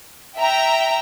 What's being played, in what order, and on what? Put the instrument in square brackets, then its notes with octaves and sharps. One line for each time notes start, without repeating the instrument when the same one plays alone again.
[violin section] E5 G5 A#5